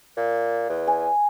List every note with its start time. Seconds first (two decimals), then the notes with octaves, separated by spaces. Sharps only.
0.17 A#2
0.69 E2
0.87 G#5